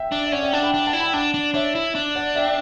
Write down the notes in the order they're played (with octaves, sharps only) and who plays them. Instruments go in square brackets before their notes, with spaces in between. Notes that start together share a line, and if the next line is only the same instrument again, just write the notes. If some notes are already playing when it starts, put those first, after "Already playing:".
Already playing: [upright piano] E5 G5
[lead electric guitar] D4
[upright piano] E5
[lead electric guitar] C#4 [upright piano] D5 F#5
[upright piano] E5 G5
[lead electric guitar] D4 [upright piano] F#5 A5
[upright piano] G5 B5
[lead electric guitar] D4
[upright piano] F#5 A5
[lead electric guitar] E4
[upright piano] G5 B5
[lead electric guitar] D4 [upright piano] F#5 A5
[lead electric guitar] D4
[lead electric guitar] D4 [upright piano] C#5 E5
[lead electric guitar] E4
D4
[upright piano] D5 F#5
E5 G5